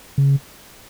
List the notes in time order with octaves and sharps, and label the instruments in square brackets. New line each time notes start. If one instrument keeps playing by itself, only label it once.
[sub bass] C#3